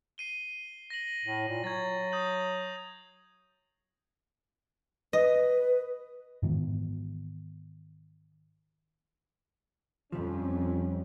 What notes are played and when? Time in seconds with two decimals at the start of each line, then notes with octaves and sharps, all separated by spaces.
0.18 C7 D#7 G7
0.90 A#6 F#7
1.25 A2
1.49 A#2
1.64 F#3 G#6 A6
2.12 D#6 G6 F#7
5.13 B4 D#5
6.43 G#2 D#3 E3 B3
10.12 F2 D3 F3 G3 C#4